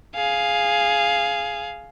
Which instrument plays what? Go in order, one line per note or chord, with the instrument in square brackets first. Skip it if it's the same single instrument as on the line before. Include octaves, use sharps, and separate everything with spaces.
[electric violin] G#4 F5